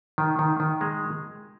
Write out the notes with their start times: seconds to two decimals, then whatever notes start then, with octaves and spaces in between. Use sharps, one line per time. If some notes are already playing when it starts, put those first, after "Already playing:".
0.18 D#3
0.39 D#3
0.60 D#3
0.81 G#3